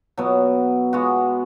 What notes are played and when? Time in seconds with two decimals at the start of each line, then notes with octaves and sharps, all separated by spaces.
0.17 B2 F#3 B3
0.93 G#3 B3 F#4